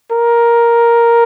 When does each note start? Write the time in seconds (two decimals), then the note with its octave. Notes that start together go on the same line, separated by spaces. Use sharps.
0.11 A#4